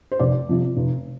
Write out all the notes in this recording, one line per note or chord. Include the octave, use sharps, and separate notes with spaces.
C5
F1 D5
F2 C3
F1